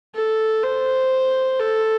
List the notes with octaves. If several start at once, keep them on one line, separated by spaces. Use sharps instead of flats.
A4
C5
A4